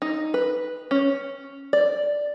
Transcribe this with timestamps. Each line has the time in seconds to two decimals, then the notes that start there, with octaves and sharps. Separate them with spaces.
0.02 D#4
0.34 B4
0.91 C#4
1.73 D5